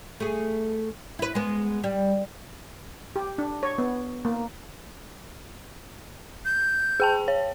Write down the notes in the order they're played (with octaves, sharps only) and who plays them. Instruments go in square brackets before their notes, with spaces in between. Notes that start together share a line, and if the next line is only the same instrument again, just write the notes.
[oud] A3 G#4
E4 B4
G#3 B3
G3
[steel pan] G4
D4
C#5
B3
A#3
[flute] G6
[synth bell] G#4 G5 A5
C#5